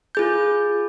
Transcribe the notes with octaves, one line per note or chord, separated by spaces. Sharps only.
F4 G#4 G6